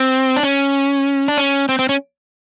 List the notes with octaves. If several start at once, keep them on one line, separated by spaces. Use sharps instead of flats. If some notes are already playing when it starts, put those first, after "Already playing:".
Already playing: C4
D4
C#4
D4
C#4
C4
C4
C#4